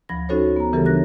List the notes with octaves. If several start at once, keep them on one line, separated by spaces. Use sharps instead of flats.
D2 F3 B5 A#6
C#4 D#4 F#4 A4 C5 C#5
B3 A#5
C#3 E3 G3 G4 A4 A#4
D4 C#5 F#6 A#6